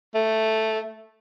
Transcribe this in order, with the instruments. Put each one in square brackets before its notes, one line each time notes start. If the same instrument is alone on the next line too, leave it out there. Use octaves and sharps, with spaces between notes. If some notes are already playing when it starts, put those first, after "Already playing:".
[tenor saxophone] A3